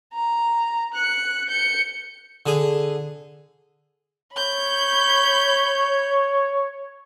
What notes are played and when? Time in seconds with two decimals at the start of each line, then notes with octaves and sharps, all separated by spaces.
0.14 A#5
0.94 F#6 C#7
1.49 G6 C#7
2.46 D3 G#4
4.34 C#5 B5 G6